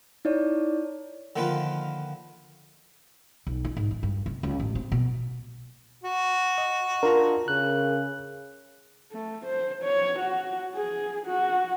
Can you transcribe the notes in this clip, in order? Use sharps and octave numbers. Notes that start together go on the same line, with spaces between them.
D#4 E4 C#5 D5
D3 D#3 F3 A#3 F4 B4
B1
E4
G#2
E3
G2
C3
C#2
A1
C4
B2
F#4
D#5
D4 F4 A#4 A#5
C#3 F#6
A3
C5
C#5
F#4
G#4
F#4